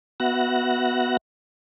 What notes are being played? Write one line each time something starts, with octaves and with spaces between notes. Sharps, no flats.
B3 F#4 E5 F#5 F#6 A#6